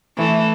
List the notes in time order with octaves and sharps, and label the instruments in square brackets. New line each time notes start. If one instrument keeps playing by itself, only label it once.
[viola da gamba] E3 A3